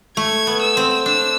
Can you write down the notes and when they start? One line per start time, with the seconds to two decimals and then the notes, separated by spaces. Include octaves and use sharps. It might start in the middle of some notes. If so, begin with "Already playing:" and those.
0.17 A3 G#6
0.47 B3
0.62 E6
0.77 C4
1.06 D4 E6